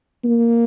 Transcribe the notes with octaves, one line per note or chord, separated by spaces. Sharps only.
A#3